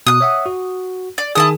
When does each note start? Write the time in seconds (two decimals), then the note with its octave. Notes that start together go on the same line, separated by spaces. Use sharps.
0.07 B2 D#6 F#6
0.21 C#5 E5 F#5
0.46 F#4
1.18 D5
1.35 D#3 E4 G#4 A5 D#6